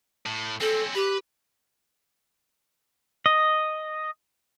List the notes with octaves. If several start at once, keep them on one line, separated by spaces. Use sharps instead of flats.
A2
C4 C#4 A4
G4 B4
D#5